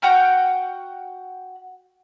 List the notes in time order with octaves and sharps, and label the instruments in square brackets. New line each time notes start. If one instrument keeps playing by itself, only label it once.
[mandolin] F#4 F#5 G5 F6